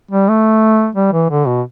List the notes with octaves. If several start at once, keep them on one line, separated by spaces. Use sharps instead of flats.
G3
A3
G3
E3
D3
B2